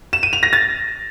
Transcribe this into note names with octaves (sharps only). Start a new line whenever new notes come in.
E7
D#7
F7
A#6
A6